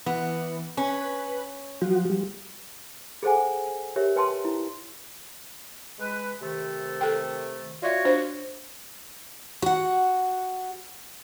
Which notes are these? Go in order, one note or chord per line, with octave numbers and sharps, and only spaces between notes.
E3 B3
C#4 B4
F3 F#3 F#4
G3
G#4 A4 C5 F#5 G#5
G4 A#4 C#5 E5
B4 G5 A5 C6
E4
G#3 B4
C3 D#3 A3
A4 G5
F4 F#4 C#5 D5 E5
D4 C5
F#4 F#5